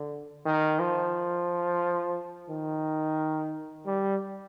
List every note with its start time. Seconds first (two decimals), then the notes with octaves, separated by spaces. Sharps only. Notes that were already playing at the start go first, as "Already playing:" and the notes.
Already playing: D3
0.45 D#3
0.79 F3
2.50 D#3
3.86 G3